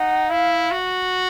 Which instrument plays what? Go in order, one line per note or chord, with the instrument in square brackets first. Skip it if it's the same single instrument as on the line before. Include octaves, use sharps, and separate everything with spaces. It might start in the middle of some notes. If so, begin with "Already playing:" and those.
Already playing: [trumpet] D#4 [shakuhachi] F#5
[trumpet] E4 [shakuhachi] F5
[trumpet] F#4